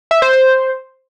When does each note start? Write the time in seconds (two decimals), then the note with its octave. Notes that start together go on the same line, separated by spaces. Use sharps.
0.11 E5
0.22 C5
0.33 C5